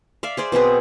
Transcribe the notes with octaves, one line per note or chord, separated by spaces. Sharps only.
D5 E5 F5
G#4 C5 D5
B2 C4 G#4 B4